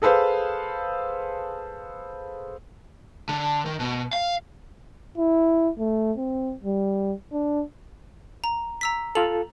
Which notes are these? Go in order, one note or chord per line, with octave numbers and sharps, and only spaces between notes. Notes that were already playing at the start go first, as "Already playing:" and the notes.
G#4 A4 B4 C5 F5
D3
D#3
B2
F5
E4
A3
C4
G3
D4
A#5
A#5 E6 B6
F4 A4 F7 F#7